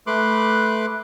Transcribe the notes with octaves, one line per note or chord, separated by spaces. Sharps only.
A3 B4 C6 D6 F#6